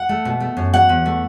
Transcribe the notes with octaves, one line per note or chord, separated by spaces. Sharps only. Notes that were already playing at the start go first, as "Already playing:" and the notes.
Already playing: F#5
A3
B2
A3
F#2
F#3 F#5
E2
A3